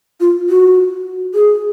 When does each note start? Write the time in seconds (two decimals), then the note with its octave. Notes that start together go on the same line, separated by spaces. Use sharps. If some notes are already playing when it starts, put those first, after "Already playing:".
0.21 F4
0.49 F#4
1.34 G#4